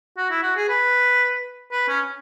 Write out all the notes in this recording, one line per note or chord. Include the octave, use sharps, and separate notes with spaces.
F#4
E4
F#4
G#4
B4
B4
C#4